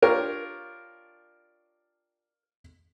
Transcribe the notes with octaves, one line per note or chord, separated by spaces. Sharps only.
D4 F4 G4 A#4 C#5